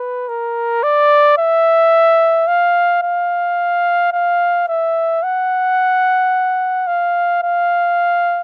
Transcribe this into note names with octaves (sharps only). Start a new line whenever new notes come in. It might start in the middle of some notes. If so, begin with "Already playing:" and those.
Already playing: B4
A#4
D5
E5
F5
F5
F5
E5
F#5
F5
F5